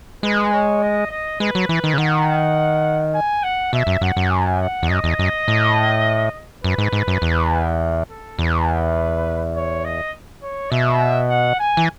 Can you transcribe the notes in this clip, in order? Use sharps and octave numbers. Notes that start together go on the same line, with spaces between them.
G#3 B4
C#5
D#5
D#5
G#3 B4
F#3
E3 B4
D#3
C#3
D#3 F#5
G#5
F#5
B2 E5
F#2
F#2 F#5
F#2
G#5
F#5
E2
F#2 D#5
E2
F#2
A2
F#2 B4
G#2
G#2
F#2
E2
A4
E2 B4
C#5
D#5
C#5
B2 E5
F#5
G#5
E3